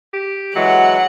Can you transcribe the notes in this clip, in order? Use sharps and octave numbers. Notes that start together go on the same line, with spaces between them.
G4
E3 F#3 G#3 F#5